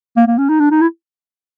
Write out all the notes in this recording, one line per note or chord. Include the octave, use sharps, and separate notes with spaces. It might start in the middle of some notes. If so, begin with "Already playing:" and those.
A#3
A#3
C#4
D#4
D4
D#4
E4